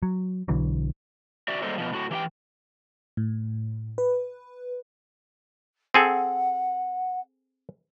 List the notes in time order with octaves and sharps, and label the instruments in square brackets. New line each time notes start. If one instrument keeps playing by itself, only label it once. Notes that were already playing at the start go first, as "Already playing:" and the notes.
[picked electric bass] F#3
B1 D3 E3 F#3
[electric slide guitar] F#4 D5 E5
F#3 G3 A#3 A4 C5 D#5
B2 F3
A2 F#4
E3 G4 E5 G5
[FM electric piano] A2
B4
[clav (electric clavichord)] C4 G#4 A4 [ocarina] F#5